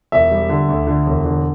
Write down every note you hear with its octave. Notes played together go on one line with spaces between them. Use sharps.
E1 E5
G3
D3
D2
D3
E1
D3